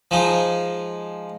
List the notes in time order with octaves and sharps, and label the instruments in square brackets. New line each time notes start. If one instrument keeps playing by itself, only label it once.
[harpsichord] F3 G#3 D#4